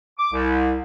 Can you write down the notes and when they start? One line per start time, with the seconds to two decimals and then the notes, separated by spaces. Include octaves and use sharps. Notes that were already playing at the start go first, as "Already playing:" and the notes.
0.18 D6
0.33 C2